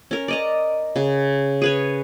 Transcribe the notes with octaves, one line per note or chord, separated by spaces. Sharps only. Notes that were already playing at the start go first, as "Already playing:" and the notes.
C#4 A#4
D5 D#5 A#5
C#3
G#4 B4 C#5